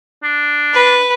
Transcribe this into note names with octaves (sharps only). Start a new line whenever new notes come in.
D4
B4